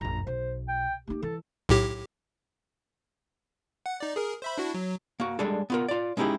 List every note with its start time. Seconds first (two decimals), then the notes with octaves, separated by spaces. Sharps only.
0.01 A#1 F#2 A#5
0.27 B1 C5
0.68 G5
1.07 A#3 D#4 G4
1.22 E3 A4
1.69 B1 A2 G4
3.86 F#5
4.00 D#4 D5
4.16 G#4 A#4
4.42 C5 E5 B5
4.58 D4 E4 F#4
4.74 F#3
5.20 A#3 F#4
5.39 G3 G#3 D4 G#4 A4
5.70 B3 F4 A#4
5.88 F4 D5
6.17 G#3 C#4 D#4 E4 G4 G#4